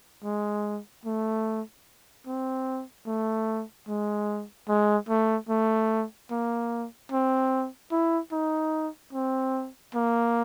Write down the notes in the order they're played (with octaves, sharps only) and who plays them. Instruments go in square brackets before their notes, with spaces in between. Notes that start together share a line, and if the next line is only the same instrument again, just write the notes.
[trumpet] G#3
A3
C4
A3
G#3
G#3
A3
A3
A#3
C4
E4
D#4
C4
A#3